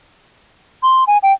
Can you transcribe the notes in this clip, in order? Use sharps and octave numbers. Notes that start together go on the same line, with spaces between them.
C6
G#5
G5